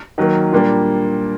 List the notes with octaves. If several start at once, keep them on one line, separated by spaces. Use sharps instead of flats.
D#3 F#3 A#3
A#2 G3 A#3 D4